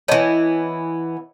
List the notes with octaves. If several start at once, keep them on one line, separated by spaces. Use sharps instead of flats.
E3 B3 C#5 D#5 A5